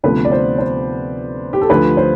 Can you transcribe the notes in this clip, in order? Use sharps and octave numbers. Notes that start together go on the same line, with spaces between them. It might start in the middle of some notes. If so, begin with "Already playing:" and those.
D2 C3 F3 B3 B4
D5
C5
C5
G4
A4
D2 D3 F3 B4
C5